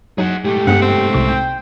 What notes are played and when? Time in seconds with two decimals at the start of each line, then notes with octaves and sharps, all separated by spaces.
0.18 F#3 D#4 G#4 F#5
0.44 G#2 A3 G4
0.67 G2 B3 G#4 F#5
0.82 C4
1.14 C2 C3 C#6
1.28 G5